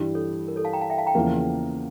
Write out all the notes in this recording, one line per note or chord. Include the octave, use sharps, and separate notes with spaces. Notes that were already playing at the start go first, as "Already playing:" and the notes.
Already playing: G2 E3 G3
A4 C#5
A#4
A4 C#5
F5 A5
G5 A#5
F5 A5
E5 G5
F5 A5
G5 A#5
E2 C#3 F3 A#3